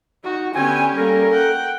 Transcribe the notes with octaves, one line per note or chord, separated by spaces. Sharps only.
D#4 F#4
D3 B3 C#4 G4 G5 G#5
G3 A#3 A4 A#4
F#5 G5